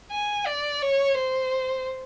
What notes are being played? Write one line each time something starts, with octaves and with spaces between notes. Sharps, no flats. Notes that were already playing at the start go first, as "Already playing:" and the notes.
G#5
D5
C#5
C5